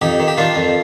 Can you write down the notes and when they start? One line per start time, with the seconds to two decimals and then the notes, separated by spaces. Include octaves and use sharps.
0.02 F2 D#4 G4
0.20 D#3
0.28 G4
0.38 D#3 D4 F4
0.55 F2